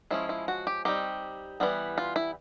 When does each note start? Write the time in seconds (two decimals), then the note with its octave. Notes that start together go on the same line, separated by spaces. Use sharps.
0.10 F3 G#3 C#4 E4
0.29 E4
0.48 F#4
0.67 G4
0.85 G3 C4 D#4 G4
1.60 E3 G3 B3
1.98 F4
2.16 E4